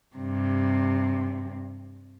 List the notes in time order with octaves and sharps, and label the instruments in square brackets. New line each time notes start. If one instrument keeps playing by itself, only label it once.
[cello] G2 C3